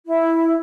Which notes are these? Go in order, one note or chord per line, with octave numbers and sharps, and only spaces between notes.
E4